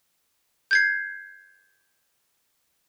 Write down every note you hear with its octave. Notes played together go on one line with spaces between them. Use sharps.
G6 G#6 C7